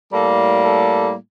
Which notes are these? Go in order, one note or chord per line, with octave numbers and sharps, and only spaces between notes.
A2 G3 A#3 A4
A4